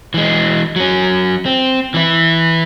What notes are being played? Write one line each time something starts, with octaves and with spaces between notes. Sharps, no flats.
E3 G#3
F#3 C#4
C4
E3 E4